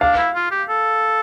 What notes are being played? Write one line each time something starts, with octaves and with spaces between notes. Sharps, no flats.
D4 F5
E4
F4
G4
A4